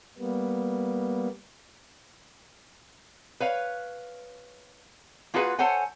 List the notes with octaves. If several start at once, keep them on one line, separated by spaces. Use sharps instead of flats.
G3 A#3 B3
B4 C#5 F5
A#3 F4 F#4 G#4 B4
A4 C5 C#5 F#5 G#5